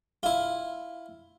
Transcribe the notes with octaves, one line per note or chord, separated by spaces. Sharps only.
E4 F4